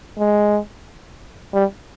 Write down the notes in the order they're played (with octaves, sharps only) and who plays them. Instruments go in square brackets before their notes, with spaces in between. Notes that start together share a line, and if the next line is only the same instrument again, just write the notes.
[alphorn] G#3
G3